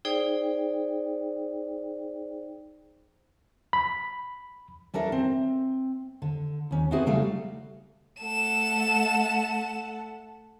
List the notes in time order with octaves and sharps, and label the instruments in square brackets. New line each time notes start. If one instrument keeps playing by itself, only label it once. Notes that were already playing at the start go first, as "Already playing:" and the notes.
[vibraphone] D#4 G#4 C5 D5 G5
[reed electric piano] B5
[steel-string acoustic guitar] C#4 D4 A4 A#4 E5
C4
D3
D#2 C#4
B3 C4 D#4 E4 F#4 G#4
C#3 F#3 G3 A3 A4 F5
[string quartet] A3 A4 F#5 [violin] E7